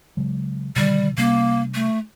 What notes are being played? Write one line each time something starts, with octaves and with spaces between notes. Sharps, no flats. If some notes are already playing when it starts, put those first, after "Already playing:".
C#3 F#3 G#3
B2 D3 D#3 G3
C3 G3 A#3 C#4
A3